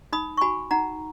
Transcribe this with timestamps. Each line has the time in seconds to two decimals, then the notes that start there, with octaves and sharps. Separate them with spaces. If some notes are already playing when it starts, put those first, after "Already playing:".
0.12 D#4 B5 D#6
0.37 C#6
0.41 F#4 G#5 B5
0.71 D#4 F#5 A#5